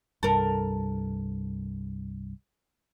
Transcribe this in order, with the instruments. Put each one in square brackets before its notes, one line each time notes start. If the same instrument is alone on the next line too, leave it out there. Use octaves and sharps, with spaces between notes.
[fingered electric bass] C2 G2 [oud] A4 A#4